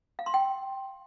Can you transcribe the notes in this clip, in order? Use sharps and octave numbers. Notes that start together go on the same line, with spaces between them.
F5
C6
G5